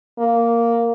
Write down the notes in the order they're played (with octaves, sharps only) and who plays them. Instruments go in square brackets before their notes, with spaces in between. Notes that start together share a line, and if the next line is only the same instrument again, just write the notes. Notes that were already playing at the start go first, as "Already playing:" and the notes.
[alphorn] A#3